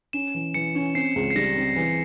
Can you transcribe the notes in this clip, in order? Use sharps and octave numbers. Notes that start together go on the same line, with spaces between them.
C#4 E7
E3
E3 C#7
C#4
C4 C7
C#2
C7
G3 A#6
C4
E3